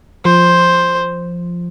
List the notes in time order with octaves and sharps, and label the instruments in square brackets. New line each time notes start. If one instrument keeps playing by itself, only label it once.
[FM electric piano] F3 [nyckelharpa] C5